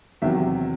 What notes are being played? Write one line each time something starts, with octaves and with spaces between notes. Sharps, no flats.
E2 C3 D#3 F#3 E5